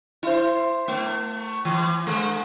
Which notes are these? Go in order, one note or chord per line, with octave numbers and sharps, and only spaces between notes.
E4 C5
A3
E3
G#3